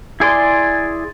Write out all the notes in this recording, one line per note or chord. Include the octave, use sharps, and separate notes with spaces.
E4 G#4 D5 C6